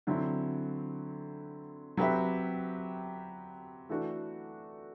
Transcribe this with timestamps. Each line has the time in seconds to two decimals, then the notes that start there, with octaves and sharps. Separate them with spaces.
0.07 D3 F#3 C4 E4
1.97 F#3 C4 G4 B4 E5
3.89 E3 A3 D4 F#4